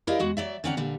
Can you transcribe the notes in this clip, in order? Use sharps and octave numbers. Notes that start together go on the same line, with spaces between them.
E4 G4 A#4 D5 D#5 F5
E2 G#3 F#4
F#3 D5 E5
D3 C4 C#4 D5 F#5 A#5
A#2 D3 G3